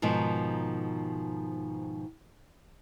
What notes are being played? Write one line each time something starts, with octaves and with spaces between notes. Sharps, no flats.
G#2 B2 D#3 F3